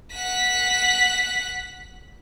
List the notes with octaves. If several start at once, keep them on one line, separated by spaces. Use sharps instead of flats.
F#5 B6